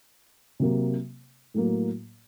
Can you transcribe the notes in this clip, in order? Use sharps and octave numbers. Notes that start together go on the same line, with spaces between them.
C3 F#3 A#3
A2 F#3 A#3